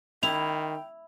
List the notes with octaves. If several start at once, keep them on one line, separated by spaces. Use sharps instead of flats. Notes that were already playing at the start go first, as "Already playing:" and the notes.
D#3 E4 G5 F7